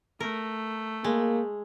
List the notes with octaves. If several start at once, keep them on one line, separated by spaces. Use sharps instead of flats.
A3 A#4
G#3 A#3